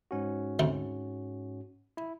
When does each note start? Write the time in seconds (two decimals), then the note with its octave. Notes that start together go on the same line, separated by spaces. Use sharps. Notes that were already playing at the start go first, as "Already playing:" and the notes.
0.11 G#2 C#4 F#4
0.59 D2 C3 C#6
1.97 E4